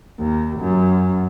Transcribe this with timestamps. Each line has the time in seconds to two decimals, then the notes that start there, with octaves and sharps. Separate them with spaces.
0.18 D#2
0.60 F#2